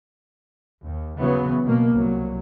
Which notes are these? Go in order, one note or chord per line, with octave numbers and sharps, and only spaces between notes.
D#2
C#3 E3 F#3 B3
B2 A#3
C2 F#3